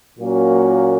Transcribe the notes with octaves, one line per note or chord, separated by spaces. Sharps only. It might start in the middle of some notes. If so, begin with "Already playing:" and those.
A#2 F#3 A#3 C#4 F#4